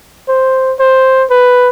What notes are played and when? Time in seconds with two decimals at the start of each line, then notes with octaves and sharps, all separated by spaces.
0.29 C5
0.80 C5
1.30 B4